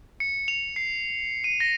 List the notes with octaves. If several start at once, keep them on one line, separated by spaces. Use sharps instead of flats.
C#7
F7
C7
D#7
A#6